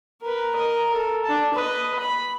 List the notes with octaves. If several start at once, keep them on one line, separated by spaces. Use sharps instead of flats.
A#4 B4
A#4 D#5
A4 A#4
D4 A5
B4 D#5
B5